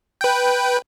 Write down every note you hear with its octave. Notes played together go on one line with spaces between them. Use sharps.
B4 G5